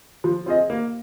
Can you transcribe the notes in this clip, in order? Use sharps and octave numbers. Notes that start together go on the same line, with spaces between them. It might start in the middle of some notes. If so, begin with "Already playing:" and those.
F3
C4 F4 G#4 D#5
A#3